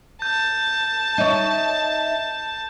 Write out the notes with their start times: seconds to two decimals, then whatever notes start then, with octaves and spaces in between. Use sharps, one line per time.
0.22 A5 G6
1.18 D#4 C#5 E5